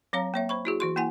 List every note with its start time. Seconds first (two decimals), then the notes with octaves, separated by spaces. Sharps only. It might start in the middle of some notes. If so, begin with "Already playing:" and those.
0.13 F#3 C4 C#5 F5 A#5
0.34 A#3 C#5 E5
0.49 C5 B5 C#6
0.65 E4 F#4 G#4
0.80 E3 F#4 C6
0.96 A#3 E4 F#5 G#5